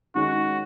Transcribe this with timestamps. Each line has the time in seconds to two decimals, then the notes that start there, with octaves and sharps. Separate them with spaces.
0.15 D#3 G#3 C#4 F#4